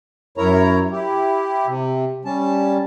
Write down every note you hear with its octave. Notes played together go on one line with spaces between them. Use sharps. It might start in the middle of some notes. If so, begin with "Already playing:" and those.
F#2 E4 A#4 C#5 A#5
E4 G4
C3
G3 C#4 A5